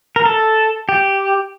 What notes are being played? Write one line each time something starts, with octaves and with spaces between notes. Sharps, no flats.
A#4
A4
G4